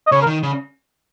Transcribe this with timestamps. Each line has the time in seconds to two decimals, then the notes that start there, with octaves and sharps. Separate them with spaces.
0.07 D#5
0.12 C#3 C#5
0.22 A#4
0.27 D#3
0.43 C#3